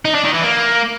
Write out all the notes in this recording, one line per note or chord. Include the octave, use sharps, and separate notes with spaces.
D#4
D4
D#3
E3
A#3